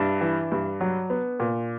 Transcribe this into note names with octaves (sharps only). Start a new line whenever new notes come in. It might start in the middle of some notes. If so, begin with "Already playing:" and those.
Already playing: G2 D4 E4
E3
G2
F#3
B3
A#2